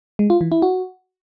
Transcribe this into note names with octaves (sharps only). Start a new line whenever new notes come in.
G#3
F4
E3
E4
F#4